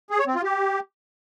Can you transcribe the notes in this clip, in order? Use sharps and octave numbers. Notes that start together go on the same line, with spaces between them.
G#4
C#5
C4
F4
G4